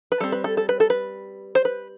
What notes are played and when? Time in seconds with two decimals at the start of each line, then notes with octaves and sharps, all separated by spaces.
0.12 B4
0.20 G3 C4 A4
0.32 B4
0.44 A4
0.57 A4
0.69 B4
0.80 A4
0.90 B4
1.55 C5
1.65 B4